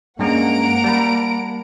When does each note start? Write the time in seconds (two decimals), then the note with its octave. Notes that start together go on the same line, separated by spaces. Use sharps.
0.19 G2 G#3 A#3 C#4 F#5 A#5 D7
0.84 G3 A5 B5